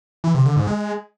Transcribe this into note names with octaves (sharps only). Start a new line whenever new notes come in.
E3
C3
D3
G#2
G#3